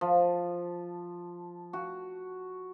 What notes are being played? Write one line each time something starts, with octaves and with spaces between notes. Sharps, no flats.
F3
F#4